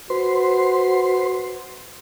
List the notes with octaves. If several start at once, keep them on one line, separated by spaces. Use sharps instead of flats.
F#4 B4 C5 C6